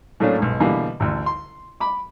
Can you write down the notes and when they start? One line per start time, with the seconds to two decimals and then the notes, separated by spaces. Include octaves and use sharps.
0.20 A2 F#3 A3 A#3 C#4 D4
0.38 B1 G#2
0.60 B2 D3 E3 G3 A#3
1.00 A1 D2
1.26 C6
1.80 B5 D6